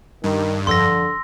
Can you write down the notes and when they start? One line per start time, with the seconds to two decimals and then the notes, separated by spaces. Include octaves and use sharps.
0.24 G2 D#3
0.67 F2 D3 C6 E6 A#6